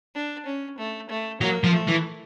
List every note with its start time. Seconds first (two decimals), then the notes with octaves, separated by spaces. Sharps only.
0.15 D4
0.46 C#4
0.78 A3
1.09 A3
1.41 F#3 A#3
1.64 F3
1.72 A3
1.88 E3